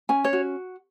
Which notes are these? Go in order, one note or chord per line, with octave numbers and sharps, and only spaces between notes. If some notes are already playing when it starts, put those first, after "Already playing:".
C#4 G#5
C#5
F#4